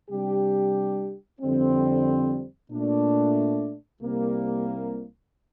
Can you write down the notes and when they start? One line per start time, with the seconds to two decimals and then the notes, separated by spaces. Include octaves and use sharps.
0.10 C3 G3 D4 G4
1.40 F2 D3 G3 C4
2.70 A#2 A3 D4
4.01 C2 C3 G3 A#3